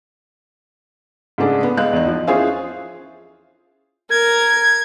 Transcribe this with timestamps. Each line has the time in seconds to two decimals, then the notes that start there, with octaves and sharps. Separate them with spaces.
1.38 G#2 C#3 A3 D4 G#4
1.63 B3
1.77 G#3 F5 F#6
1.93 E2 D#4
2.07 F3
2.27 C#4 E4 F4 G#4 C5 F5
4.11 A#4 G#6